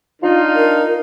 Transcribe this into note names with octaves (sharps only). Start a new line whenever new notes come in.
D4 D#4 F4
A#4